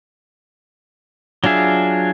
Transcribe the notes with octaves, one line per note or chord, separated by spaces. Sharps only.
F#3 D4 F4 G#4 E5